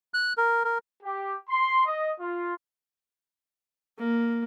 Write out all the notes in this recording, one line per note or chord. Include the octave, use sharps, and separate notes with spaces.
F#6
A#4
A#4
G4
C6
D#5
F4
A#3